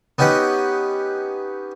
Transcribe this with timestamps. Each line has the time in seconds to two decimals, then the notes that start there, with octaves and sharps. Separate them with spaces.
0.18 B3 C#4 D#4 G4 D#5 F#5